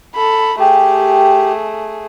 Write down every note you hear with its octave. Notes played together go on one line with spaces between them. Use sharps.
A4 B5
A3 G4 G#4